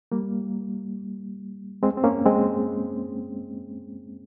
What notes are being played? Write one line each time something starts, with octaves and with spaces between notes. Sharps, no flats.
G3 A#3
G#3 C4
C4
A#3 C#4
G#3 C4